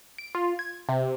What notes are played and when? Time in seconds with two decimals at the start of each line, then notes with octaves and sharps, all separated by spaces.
0.18 D7
0.35 F4
0.59 G#6
0.89 C3